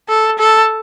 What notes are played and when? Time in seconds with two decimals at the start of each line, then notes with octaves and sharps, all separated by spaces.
0.09 A4
0.39 A4